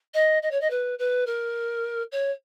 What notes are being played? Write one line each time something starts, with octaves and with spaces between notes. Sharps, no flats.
D#5
D#5
C#5
D#5
B4
B4
A#4
C#5